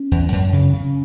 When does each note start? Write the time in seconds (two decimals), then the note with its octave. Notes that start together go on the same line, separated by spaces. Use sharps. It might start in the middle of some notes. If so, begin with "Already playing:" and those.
Already playing: C#4
0.11 E2
0.32 F#2
0.53 C#3
0.73 C#3